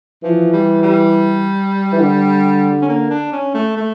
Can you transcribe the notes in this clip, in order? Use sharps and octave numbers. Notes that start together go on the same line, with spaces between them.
E3 F3
G3
G3
E3
D3
C#4
A#3
D4
C#4
A3
A3